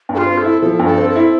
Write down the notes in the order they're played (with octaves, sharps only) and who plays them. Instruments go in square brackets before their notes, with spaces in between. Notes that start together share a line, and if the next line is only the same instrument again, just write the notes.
[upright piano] G2
[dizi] A4
F4
[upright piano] C4
[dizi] A4
[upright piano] E4
[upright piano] F3 [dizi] A4
[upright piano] G2
[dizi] A4
[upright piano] C4
[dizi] A4
[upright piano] E4